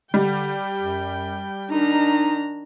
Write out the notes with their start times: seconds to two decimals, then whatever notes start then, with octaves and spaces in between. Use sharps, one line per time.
0.14 D3 G3 G5
0.80 F#2
1.71 D#3 D4 D#4 A#5